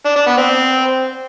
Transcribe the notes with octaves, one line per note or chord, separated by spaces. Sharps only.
D4
D4
B3
C4